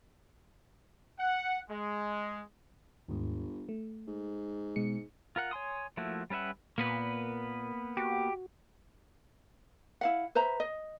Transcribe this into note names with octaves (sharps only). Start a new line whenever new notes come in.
F#5
G#3
G1 D#2 G#2
A3
G#2
B2 G#3 C#7
F4 A#4 F#5
C#5 G#5 C6 D#6
F3 A3 A#3 E4 F#4
G3 C#4 B4 E5 F#5
A#2 A#3 B3 B4
F#4 G4
E4 F5 F#5
B4 C5 E5 A#5
D#5